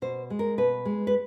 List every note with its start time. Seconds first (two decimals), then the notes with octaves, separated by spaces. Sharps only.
0.02 B2 C5
0.30 G#3
0.39 A#4
0.58 B2 B4
0.85 G#3
1.07 B4